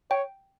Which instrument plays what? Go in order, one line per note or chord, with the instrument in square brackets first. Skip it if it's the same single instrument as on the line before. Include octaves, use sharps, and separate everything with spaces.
[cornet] C#5 [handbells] G5